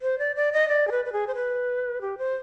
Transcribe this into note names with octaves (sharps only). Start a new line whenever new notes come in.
C5
D5
D5
D#5
D5
G#4
B4
B4
G#4
C5
B4
G4
C5